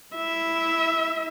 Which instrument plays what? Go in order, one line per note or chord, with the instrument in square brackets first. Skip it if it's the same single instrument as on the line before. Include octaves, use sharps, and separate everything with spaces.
[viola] E4 E5